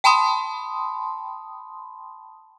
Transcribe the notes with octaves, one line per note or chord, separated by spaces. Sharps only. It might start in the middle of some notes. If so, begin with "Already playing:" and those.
G5 A5 B5 C6 D#6